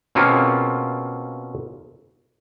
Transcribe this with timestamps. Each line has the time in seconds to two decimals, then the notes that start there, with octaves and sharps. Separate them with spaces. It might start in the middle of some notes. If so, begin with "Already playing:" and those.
0.15 B2 A#3 C4 C#4 F4 G#4